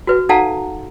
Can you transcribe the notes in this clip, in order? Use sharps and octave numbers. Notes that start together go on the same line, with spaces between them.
F#4 B4
D#4 A4 F5 F#5 A5 A#5